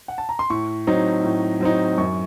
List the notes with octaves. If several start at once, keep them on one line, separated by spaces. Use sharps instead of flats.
F#5
A5
A#5
C6
A2 C#6
F#3 C4 D#4
A2
F#3 C4 D#4
F#2 C#6